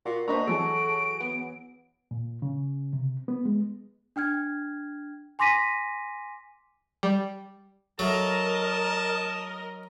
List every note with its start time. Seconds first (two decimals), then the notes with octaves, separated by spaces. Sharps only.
0.06 A#2 F#4
0.28 A#3 D4 F#4 B4 C5 D#5 A#5
0.47 E3 F#3 G#4 A4 D7
1.20 B3
2.11 A#2
2.42 C#3
2.93 C3
3.28 B3
3.45 G#3
4.16 D4 G5 F6 G#6
5.39 G#5 C6 D6 A#6 B6 D#7
7.03 G3
7.99 F#3 A4 A#4 D#5 E5 A5